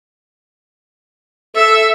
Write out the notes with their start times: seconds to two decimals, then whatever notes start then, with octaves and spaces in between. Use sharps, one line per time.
1.55 A4 E5